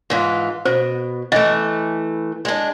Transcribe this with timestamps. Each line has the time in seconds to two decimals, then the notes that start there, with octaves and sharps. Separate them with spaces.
0.10 G#2 E3 F4
0.65 B2 C5
1.32 E3 A3 D#5
2.45 G#3 D4